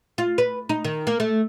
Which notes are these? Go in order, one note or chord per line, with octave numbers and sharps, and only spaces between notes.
F4
B4
D#4
D#3
A#3
A3